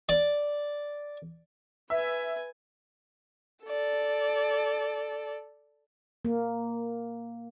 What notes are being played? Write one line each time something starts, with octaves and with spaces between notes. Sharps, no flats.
D5
B4 E5 G#5
A4 D5
A#3